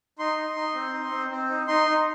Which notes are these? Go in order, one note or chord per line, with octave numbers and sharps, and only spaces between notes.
D#4 C6
D#4
D#4
C4
D#4
C4
C4
D#4
D#4 C6
D#4